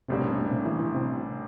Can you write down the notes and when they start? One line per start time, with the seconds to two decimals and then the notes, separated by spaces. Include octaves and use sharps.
0.08 A1 A2 C3 G3 A#3 D4
0.19 C3
0.31 C3
0.41 A#2
0.51 C3
0.66 E3
0.79 E3
0.94 C3